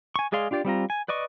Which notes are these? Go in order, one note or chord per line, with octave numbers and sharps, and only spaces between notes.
G#5 C#6
G#3 G#4 D5 F5 C6
D4 F4 G4 D5
G3 C4 F4 A#5
G#5
B4 D5 D#5 C#6